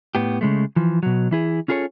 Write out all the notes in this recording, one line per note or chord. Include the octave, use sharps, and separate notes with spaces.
A2 B3 G4
C#3 G#3 A3
E3 F3
B2 F#3
E3 E4 G#4
C#4 F4 G#4 A4 B4 C#5